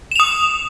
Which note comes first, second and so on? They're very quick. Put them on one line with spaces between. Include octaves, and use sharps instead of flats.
E7 F7 D#6